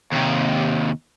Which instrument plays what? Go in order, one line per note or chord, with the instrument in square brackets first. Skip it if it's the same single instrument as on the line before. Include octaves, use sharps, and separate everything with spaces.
[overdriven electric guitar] D#2 C3